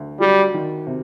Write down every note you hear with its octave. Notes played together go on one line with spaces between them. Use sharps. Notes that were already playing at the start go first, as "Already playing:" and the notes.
Already playing: D2
F#3 G3
D#3
C3